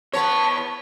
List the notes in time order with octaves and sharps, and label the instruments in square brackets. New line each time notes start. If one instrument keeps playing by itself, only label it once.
[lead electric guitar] E2 A5 [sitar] B3 C#5 [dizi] C#6